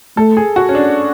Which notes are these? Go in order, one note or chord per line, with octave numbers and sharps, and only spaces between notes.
A3 A4
G#4
F#4
C#4
D4